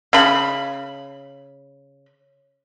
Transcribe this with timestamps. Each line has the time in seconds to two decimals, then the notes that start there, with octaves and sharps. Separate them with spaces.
0.13 C#3 B5